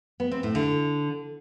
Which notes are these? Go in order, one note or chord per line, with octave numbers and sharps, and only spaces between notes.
B3
C4
A2
D3